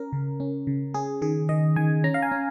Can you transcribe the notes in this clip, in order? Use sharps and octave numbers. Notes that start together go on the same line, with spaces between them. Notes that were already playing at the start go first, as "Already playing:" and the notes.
Already playing: C#4 A#4
C#3
C#4
C#3
C#4 G#4
D#3 G#4
D#3 D#5
D#3 G#5
C#4 A#5
F5
G#5
C#4